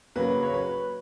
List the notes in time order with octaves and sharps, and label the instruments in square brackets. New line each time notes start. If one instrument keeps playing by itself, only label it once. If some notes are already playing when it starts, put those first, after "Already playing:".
[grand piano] C#3 F#3 A#3 B4
C#5
B4